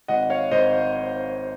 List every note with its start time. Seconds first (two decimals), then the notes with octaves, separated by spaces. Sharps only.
0.08 G#1 D#5 F#5
0.30 C#5 F5
0.51 G#1 C5 D#5